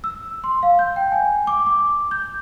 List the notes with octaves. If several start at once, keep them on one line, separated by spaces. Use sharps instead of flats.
E6
C6
F5
G6
G5
G#5
D6
D6
G6